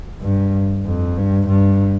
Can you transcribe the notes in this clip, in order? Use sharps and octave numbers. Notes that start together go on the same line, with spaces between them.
G2
F2
G2
G2